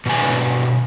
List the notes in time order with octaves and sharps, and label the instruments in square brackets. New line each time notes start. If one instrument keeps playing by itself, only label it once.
[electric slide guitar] B2 D3 G#5